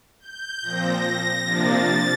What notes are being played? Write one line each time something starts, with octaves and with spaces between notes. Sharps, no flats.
G6
A#2 F3 C4 A#6
C3 F3 A#3 D4 A6